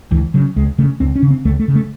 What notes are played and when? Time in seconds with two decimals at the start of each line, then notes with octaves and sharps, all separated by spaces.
0.11 C#2 E3
0.34 C#3 F#3
0.56 C#2 G#3
0.78 C#3 A3
1.00 C#2 C4
1.15 C#4
1.22 C#3
1.30 C4
1.45 C#2 A3
1.59 A3
1.68 C#3
1.75 A3